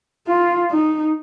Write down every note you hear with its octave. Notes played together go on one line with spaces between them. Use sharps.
F4
D#4